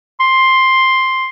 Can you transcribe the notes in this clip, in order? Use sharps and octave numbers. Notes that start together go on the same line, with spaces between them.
C6